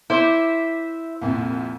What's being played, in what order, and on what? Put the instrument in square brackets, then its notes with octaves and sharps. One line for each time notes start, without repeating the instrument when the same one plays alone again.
[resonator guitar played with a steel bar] E4 [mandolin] C5 E5 [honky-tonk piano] C6 D6 G6
[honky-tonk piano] C2 F2 A#2